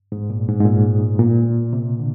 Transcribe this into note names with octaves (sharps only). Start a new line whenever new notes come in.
G#2
A#2
G#2
G#2
A#2
A#2
C3
D3